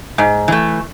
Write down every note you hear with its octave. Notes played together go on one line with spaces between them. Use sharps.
G#2
E3 A3